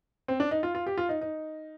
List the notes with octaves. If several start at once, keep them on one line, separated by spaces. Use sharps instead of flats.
C4
D4
D#4
F4
F4
G4
F4
D#4
D#4